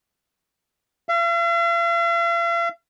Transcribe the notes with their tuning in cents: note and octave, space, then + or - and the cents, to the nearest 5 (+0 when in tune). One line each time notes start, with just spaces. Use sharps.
F5 -45